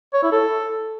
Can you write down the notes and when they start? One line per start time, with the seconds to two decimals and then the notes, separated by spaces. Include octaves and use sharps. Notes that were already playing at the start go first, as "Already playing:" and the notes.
0.14 C#5
0.23 E4
0.32 A4